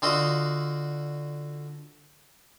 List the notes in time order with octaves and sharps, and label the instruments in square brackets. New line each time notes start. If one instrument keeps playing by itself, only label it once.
[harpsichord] D3 F4 F#4 D#5